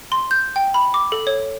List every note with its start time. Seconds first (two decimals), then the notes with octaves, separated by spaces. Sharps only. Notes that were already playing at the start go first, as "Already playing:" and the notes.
0.12 C6
0.31 G6
0.56 G5
0.74 B5
0.94 D6
1.12 A4
1.27 C#5